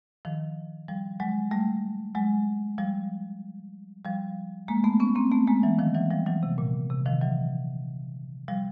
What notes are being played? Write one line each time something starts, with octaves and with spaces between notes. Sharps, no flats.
D#3 F3
F3 G3
F#3 G#3
G3 A3
F#3 G#3
F3 G3
F3 G3
G#3 A#3
A3 B3
B3 C#4
A#3 C4
A3 B3
G#3 A#3
E3 F#3
D#3 F3
E3 F#3
F3 G3
E3 F#3
C3
A#2
C3
D#3 F3
E3 F#3
F3 G3